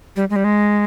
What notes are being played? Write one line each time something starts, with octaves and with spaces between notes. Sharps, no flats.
G3
G#3
G3
G#3